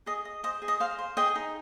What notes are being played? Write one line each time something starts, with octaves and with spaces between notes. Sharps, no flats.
G#4 D#5
D#5
C5 D#5
G#4
D#5
C5 F5
C5
G#4 D#5 G5
D#4